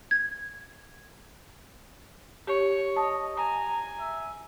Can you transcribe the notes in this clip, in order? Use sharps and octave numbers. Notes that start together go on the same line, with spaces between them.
G#6
G4 C#5
D#5 A5
G#5 A#5
E5